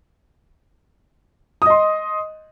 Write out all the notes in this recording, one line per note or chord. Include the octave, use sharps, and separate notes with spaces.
D#5 C6 D#6